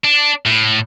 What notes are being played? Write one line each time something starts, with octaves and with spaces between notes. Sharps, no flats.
D4
A2